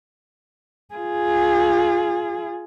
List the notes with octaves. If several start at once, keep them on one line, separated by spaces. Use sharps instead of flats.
F4 G#4